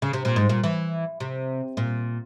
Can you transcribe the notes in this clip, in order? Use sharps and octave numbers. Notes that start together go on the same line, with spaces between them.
C#3
C3
A#2
G#2
A#2
E3
C3
A#2